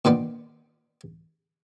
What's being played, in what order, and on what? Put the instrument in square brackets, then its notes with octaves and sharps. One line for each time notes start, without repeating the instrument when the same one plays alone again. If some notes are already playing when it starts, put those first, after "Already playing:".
[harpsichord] A#2 D#3 B3 D4